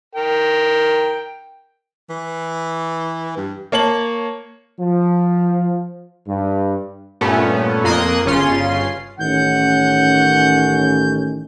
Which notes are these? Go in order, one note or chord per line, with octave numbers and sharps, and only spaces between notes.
A#4 G5
E3
G2
A#3 C#5 A5 F#7
F3
G2
G2 A#2 A3 B3 C#4
F2 A#3 C6 D#6 F#6 G#6
G1 C#3 C#4 F4 C6
A1 D#3 C#4 F#5 G6